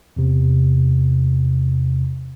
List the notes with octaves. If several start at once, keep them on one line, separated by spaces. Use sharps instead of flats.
E2 C3